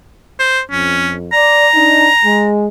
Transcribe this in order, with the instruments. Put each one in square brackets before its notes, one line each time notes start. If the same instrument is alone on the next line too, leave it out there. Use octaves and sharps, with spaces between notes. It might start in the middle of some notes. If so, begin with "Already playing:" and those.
[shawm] C5
[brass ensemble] F2 [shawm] C#4
[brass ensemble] D5 [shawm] A#5
[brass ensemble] D4 D#4
G#3